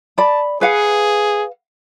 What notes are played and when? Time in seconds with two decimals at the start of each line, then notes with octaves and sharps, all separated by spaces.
0.18 D5 A5 B5
0.61 G#4 B4 F5 F#5